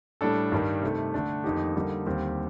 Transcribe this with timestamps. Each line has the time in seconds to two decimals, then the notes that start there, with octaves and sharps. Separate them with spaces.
0.21 A2 G3 D4 A4
0.52 G2 D#3 G3 D4
0.82 C3 D#3 A3
1.14 D3 A3 D4
1.44 F2 D#3 A#3 D#4 G4
1.76 D3 G3 A#3 D#4
2.06 D#2 D3 G3 C4 G4